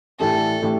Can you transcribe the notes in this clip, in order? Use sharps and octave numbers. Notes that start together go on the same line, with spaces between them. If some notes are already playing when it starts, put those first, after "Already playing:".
A2 E3 A3 D4 G4 A4
A2 E3 A3 D4 G4